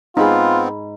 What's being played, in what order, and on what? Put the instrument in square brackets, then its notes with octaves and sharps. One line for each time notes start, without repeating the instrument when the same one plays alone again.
[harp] G#2 B5 [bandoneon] B3 C4 [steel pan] D#4 G#4 [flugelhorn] F4